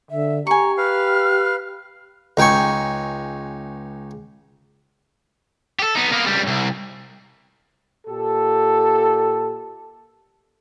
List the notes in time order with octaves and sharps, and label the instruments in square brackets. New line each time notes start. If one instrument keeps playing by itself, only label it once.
[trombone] D3 [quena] E5
[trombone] G4 [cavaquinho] G#5 C#6 [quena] A#5
[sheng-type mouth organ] B4 F5 [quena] F6
[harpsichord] C#2 D#4 G5 G#5 C#6
[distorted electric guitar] G4 A4
B3 D#4
A#3 B3
C#2 G3
C2
[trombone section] A#2 G4 A4